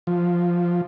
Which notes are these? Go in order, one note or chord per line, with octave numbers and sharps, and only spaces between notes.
F3